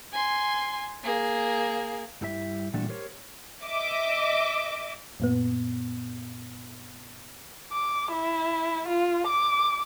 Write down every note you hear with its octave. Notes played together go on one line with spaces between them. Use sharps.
G#5 C6
A#3 G#4
G2 G3 E4 G#4 E5
A#2 E3 G3 A3 D4 F#4
G4 A#4 C5 C#5
D#5 E5 D6
F#2 A#2 B3
D6
E4
F4
D6